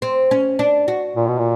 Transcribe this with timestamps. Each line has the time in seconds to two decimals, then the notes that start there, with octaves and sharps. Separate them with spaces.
0.02 C4
0.31 C#4
0.59 D4
0.88 F#4
1.16 A#2
1.27 B2
1.39 A#2